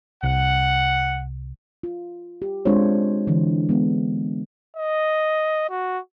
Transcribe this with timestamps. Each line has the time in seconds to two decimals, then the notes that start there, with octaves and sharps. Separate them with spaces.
0.23 C2 F#5
1.83 F4
2.42 G4
2.65 G#3 C4 D4 F4 C5 C#5
3.27 D3 E3
3.69 G#3 B3
4.77 D#5
5.70 F#4